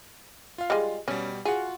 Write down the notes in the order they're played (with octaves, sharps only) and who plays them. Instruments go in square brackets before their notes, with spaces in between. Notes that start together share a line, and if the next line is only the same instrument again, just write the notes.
[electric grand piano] F4 F5
[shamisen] G3 G#3
[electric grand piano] B2 G3 [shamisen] C#4
[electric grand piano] F4 F#4 F#5 [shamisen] G#4